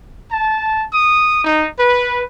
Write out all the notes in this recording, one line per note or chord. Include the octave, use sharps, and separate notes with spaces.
A5
D#6
D#4
B4